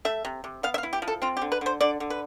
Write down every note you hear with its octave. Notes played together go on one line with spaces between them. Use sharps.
A3 E5
C3
C3
B3 F5
E5
F5
E4
G4
F3
A4
C4 F4
G4
D3
B4
D3 C5
D3 D5
D3
B4